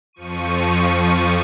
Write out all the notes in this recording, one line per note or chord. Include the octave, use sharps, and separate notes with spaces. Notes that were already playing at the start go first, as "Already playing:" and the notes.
F2 F3 C#6 D#7